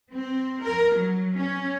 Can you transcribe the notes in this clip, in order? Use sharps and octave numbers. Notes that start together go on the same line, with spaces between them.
C4
A#4
F#3
C#4